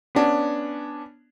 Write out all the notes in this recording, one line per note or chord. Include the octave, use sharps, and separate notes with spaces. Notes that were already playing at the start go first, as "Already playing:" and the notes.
B3 C#4 D4